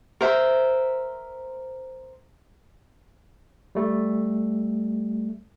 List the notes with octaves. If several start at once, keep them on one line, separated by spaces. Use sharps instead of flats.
A#4 C5 E5
G3 A3